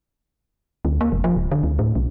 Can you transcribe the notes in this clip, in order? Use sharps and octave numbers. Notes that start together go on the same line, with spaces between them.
D2
A#3
F1
F3
D1
D3
D2
A2
B1